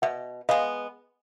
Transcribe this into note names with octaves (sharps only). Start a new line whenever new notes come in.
B2 E5 F#5
G#3 B3 D#5 F5